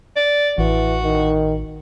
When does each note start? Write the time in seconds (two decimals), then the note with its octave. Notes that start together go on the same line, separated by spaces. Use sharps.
0.16 D5
0.58 A1 E3 F#4
1.04 D#3